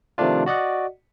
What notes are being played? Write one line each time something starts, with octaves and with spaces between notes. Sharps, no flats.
C3 D#3 F3 A3 D4 F4
F#4 D5 D#5 F#5